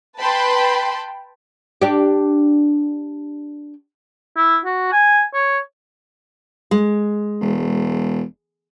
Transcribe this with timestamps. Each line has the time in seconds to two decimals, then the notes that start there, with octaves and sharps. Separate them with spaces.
0.20 B4 G5 A5 B5 C6
1.82 D4 G4
4.37 E4
4.65 F#4
4.92 G#5
5.34 C#5
6.71 G#3
7.41 E1